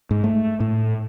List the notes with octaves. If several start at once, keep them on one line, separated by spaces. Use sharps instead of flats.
G#2
A3
A2